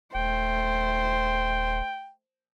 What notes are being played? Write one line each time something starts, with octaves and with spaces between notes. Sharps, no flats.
D#1 A3 C5 G5